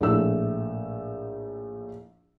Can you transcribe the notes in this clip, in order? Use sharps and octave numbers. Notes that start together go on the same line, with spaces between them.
A#1 A2 A3 E6